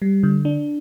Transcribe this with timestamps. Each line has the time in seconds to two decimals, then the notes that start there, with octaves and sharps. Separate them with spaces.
0.02 G3
0.23 D3
0.45 D4